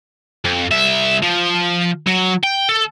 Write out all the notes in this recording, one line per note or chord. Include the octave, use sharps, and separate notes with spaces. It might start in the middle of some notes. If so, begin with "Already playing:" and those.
F2
C2 E5
F3
F#3
G5
A4